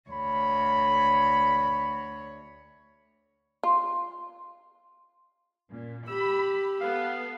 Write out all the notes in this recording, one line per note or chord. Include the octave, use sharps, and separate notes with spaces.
D2 C#5 B5
F4
A#2 C#4
G4 B5 E6
B3 A4 F5